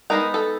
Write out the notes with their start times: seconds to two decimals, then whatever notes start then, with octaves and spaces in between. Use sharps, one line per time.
0.10 G#3 B3 D#4 A#4
0.34 A4